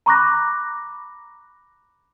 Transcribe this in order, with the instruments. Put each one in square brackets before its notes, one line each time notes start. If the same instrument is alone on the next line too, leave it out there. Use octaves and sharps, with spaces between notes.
[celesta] A#5 B5 C#6 D6 F#6 A#6